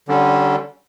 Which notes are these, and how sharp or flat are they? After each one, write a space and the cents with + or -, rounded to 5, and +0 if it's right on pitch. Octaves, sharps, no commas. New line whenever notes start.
D3 +0 G3 -25 C#4 +0